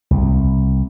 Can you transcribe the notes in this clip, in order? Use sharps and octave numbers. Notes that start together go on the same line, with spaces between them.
C2